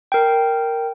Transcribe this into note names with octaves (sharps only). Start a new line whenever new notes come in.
A#4 G5